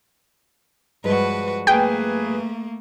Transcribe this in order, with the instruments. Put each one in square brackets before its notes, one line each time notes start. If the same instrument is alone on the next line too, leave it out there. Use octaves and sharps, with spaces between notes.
[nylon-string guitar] G2 F3 G#3 [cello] F#4 B4
[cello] A3 A#3 [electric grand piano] G#4 B4 G#5 [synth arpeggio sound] G5